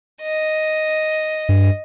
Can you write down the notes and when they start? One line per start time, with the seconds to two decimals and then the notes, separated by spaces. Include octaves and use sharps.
0.22 D#5
1.49 G2